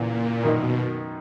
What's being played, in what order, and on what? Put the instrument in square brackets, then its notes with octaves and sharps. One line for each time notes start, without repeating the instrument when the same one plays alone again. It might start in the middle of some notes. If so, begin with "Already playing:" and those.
Already playing: [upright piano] E2 C#3 E3 [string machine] A#2
[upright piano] F#2 D#3 A#3 D#4 [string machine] B2